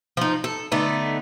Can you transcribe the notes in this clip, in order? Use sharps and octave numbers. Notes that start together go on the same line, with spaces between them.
F3 D#4
A4
D3 A3 B3 D#4